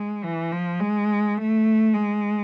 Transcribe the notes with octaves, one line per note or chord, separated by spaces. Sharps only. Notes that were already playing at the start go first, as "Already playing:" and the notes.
Already playing: G#3
E3
F3
G#3
A3
G#3